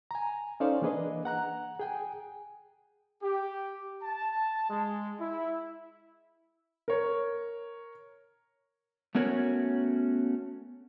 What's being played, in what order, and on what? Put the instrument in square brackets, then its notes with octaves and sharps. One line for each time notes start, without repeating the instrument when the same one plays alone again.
[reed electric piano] G#5 A#5
C#4 D#4 A4 C5 D5 F5
E3 A#3 D4 G#4 B4 D#5
F#5 A#5 F#6
G#4 G5 G#5
[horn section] G4
A5
G#3
E4
[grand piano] A#4 C#5
[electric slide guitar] A3 B3 C#4 F#4 A#4 C#5